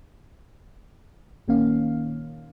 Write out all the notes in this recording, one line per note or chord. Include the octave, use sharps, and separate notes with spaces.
A#1 D#3 A#3 C#4 F5